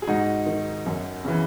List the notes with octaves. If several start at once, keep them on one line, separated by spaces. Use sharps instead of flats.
G#4
G#2 D#4 F#4
D#3
F#2
C#3 E3